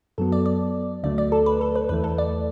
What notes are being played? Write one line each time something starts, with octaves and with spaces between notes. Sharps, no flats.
F#2 F#3 B3 A4
D5
D5
D2 D3 F#3 A3 D5
D5
A4
B4
A4
B4
E2 E3 A3 B4
A4
D5